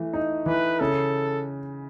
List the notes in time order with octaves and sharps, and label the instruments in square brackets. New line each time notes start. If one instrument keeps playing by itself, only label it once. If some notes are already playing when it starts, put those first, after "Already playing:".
Already playing: [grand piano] E3 A3
D#4
[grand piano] E3 [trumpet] B4
[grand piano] C#3 [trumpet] A4